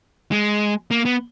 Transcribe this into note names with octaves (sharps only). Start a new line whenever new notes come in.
G#3
A#3
B3